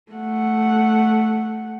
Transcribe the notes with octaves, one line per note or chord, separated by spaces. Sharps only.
A3 F#5